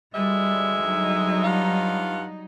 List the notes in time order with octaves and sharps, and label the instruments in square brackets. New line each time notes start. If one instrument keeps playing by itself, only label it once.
[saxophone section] D2 G#3 E5 [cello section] G3
[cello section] F#3 G3 D#4
[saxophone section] G2 F4 F#5